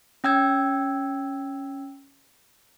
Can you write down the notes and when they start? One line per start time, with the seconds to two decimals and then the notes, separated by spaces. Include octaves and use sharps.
0.24 C#4 G5 E6 G#6